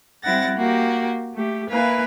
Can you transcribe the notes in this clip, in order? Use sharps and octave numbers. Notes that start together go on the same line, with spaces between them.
G3 C4 E4 F#5 A6 A#6
A#3 F#4 G4
A3 G4
A#3 E4 B4 F5 G#5